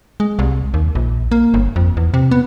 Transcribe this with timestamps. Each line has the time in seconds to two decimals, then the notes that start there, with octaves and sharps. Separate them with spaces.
0.20 G#3
0.39 C2
0.74 D#2
0.95 A#1
1.32 A#3
1.54 G1
1.76 F2
1.97 E2
2.14 C3
2.31 B3